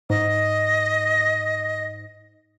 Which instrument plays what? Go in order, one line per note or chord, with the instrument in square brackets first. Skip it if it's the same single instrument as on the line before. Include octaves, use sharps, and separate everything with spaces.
[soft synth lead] G#2 [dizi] D#5